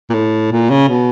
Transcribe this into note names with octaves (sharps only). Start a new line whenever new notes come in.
A#2
A2
A#2
C#3
B2